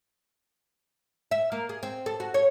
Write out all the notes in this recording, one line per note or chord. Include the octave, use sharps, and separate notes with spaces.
E5
A#3
G#4
C4
A4
F#4
C#5